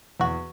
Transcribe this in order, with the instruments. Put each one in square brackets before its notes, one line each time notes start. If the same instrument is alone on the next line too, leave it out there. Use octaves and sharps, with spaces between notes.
[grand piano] E2 [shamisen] F#4